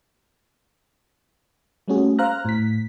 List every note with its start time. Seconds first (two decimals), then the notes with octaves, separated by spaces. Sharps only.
1.88 G3 A3 A#3 C#4 F#4 G#4
2.19 C5 F5 A#5 F6 F#6 A#6
2.45 A2 B6